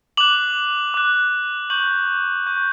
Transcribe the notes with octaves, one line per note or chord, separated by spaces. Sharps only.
D6 F#6 F#7
D6 F#6
C#6 G6 F#7
C#6 G6